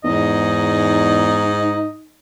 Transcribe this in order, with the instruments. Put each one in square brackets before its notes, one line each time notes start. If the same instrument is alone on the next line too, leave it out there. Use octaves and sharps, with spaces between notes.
[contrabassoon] E2 [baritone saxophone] G#2 [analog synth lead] D#4 [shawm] D#5